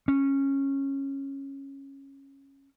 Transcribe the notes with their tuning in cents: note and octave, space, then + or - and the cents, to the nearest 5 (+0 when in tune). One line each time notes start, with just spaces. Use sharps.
C#4 -15